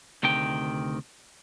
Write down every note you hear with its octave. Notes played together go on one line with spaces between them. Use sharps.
D2 C3 D#3 G5